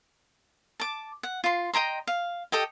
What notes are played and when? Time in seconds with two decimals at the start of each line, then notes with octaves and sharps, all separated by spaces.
0.80 A5 D6
1.23 F#5
1.44 F4 C6
1.73 D#5 G5 A#5 C6
2.07 F5
2.52 G4 A4 D#5 G5